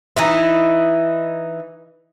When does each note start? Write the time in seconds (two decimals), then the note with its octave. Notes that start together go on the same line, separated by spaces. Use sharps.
0.16 E3 D#4 E4